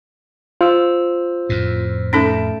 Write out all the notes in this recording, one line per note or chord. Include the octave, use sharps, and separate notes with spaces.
F4 C5 E6
F2 A2
A3 C#4 D#4 A4 A5 D7